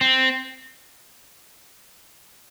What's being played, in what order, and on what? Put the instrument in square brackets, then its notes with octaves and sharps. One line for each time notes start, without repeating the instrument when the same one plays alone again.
[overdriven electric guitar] C4